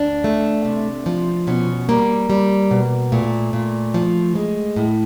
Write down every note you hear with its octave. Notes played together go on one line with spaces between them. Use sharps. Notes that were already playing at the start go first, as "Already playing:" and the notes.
Already playing: D2 D4
A3
C3
F3
B2 C#4
G3 A#3
G3
B2
A#2 A3
A#2
F3
G#3
A2